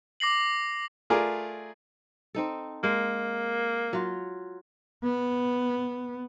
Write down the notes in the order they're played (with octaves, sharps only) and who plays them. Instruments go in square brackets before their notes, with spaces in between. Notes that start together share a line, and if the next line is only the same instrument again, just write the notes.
[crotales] D6 A#6 C7 F#7
[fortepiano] A3 F4 G#4 A#4 D5
[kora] C4 D#4 A4
[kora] G#3 [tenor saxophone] A#3
[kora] F#3 F4
[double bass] B3